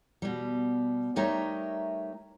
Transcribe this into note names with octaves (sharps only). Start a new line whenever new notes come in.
B2 G3
G3 A3 D#4 A#4 C#5 E5